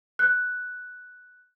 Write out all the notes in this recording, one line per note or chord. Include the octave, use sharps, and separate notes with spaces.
F#6